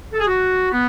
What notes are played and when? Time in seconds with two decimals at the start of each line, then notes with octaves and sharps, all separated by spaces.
0.12 A4
0.20 G#4
0.27 F#4
0.71 B3